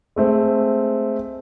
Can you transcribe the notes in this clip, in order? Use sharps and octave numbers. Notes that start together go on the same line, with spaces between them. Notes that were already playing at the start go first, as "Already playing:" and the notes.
G#3 A3 C4